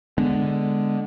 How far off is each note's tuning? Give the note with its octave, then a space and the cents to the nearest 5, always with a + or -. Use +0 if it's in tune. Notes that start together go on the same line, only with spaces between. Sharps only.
D3 +0 G#3 -5 B3 +5